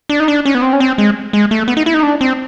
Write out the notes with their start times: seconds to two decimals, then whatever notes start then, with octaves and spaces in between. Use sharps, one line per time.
0.09 D4
0.20 D#4
0.28 D4
0.46 C#4
0.55 B3
0.62 C4
0.73 C#4
0.80 C4
0.98 G#3
1.33 G#3
1.51 A3
1.68 B3
1.77 D#4
1.86 E4
1.94 D#4
2.03 D4
2.21 C4